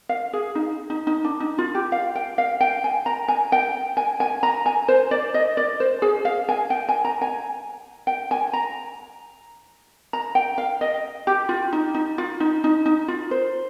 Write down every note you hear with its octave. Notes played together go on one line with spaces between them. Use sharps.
F5
G#4
D#4
D#4
D#4
D4
D#4
F4
G4
F5
G5
F5
G5
G#5
A#5
G#5
G5
G#5
G#5
A#5
G#5
C5
D5
D#5
D5
C5
G#4
F5
G#5
G5
G#5
A#5
G#5
G5
G#5
A#5
A#5
G5
F5
D#5
G4
F4
D#4
D#4
F4
D#4
D#4
D#4
F4
C5